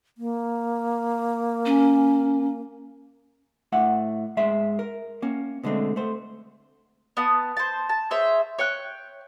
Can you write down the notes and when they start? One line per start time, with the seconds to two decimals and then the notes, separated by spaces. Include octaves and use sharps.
0.18 A#3
1.66 C#4
3.72 A2 A3 E5 F#5
4.37 G#2 G#3 E5 C6
4.79 A#4
5.22 A#3 C#4
5.63 B2 D3 G#3 A3 C4
5.96 A3 C5
7.17 B3 A5 D#6
7.57 C5 A5
7.89 A5
8.11 G#4 C5 C#5 E5
8.59 C#5 G5 F#6